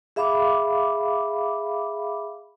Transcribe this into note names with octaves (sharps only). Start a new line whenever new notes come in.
G#4 E5 F5 B5 D6